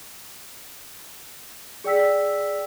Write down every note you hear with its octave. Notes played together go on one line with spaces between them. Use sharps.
G#4 D5 G5 E6 B6